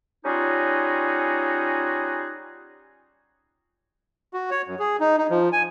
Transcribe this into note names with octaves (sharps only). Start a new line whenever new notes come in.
G3 C#4 D#4 F4 F#4 G#4
F#4
C#5
F#2
G#4
D#4
D#4
F3
G#5